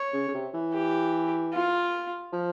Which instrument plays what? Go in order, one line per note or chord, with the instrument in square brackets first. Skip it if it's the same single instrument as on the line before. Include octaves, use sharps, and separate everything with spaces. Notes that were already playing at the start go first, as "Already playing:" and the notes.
Already playing: [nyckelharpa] C#5
[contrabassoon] C#3
C#3
C3
E3
[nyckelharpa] G4
F4
[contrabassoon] F3